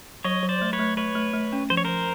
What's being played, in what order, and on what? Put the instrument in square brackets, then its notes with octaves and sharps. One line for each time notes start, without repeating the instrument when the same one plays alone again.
[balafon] F#3 [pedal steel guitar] C#5 D#5
[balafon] F#3
[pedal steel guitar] C5 D5
[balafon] A3
[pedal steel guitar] B4 C#5
[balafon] A3
[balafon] A3 [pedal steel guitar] B4 C#5
[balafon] A3
A3
C#4
[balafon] F3 [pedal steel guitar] C5
[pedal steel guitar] C#5
[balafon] F3 [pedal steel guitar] A#4 C5